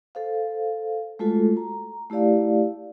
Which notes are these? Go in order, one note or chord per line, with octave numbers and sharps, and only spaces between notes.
A4 C5 F5
G#3 A3 F4 F#4 A4
A#5
A3 E4 G4 D5 F5